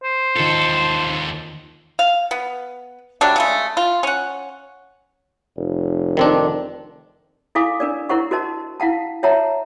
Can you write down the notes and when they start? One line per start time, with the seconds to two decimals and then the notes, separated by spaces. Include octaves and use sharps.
0.04 C5
0.36 D#2 D#3 F4 A4
1.99 F5
2.31 B3
3.21 F#3 G3 A3 D4
3.36 C#3 G#3 A3
3.77 F4
4.03 C#4 F#5
5.56 F1
6.17 D#3 C4 D4
7.55 E4 A4 F5 G#5 D6
7.80 D4 A#4 D5
8.09 E4 A#4 C5 F#5 C#6
8.31 F#4 A#4 C5 D#5 A5
8.80 E4 F5 F#5 A5
9.23 C#5 E5 F#5 A5 A#5